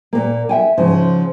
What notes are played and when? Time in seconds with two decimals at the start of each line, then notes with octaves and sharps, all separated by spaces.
0.13 A#2 A#3
0.49 E5 G5 G#5
0.78 G#2 C#3 F3